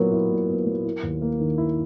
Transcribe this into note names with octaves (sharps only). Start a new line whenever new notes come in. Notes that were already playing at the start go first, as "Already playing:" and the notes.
Already playing: A#2 F#3 B3 E4 A#4
E4
A#2
B3
F#3
E4
D#2
A#3
D#3
E4